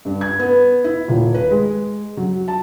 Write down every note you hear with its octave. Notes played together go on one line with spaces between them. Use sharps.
G2
G#6
B3
E4
D#1
B4
G#3
F#3
A5